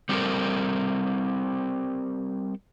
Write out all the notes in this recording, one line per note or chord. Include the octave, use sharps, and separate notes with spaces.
G3 C4 F4 G4 A4 A#4